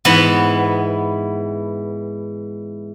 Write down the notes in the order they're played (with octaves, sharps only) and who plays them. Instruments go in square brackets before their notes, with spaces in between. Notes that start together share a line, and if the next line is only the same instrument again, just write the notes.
[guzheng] G#2 E3 B3